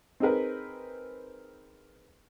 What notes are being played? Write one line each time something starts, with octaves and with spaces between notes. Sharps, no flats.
C4 D#4 G#4 A#4 B4